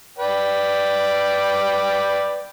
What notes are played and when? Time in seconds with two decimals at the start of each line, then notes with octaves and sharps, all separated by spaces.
0.18 B4 D5 G5